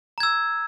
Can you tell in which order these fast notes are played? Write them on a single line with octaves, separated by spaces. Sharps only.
A#5 G#6 E6